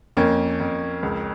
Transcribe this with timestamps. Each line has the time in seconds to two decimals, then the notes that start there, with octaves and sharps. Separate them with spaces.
0.17 F2 A#3 C#4
0.60 F2
1.03 C#2